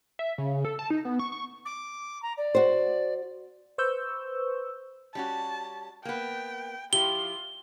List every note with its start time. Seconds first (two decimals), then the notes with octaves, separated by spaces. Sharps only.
0.19 E5
0.38 C#3
0.65 A4
0.79 A5
0.90 D#4
1.05 B3
1.19 C#6
1.32 C#6
1.65 D6
2.22 A#5
2.37 D5
2.55 F#4 C5
3.78 B4 C5 C#6 E6 G6
5.15 G3 C#4 F#4 A5
6.05 A#3 B3 G5
6.93 F3 E4 F4 G4 G7